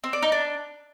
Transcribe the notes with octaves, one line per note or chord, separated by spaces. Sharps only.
C4
D5
D#4
D4